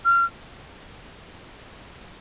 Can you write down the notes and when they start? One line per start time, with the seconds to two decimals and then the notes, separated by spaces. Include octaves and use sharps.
0.05 F6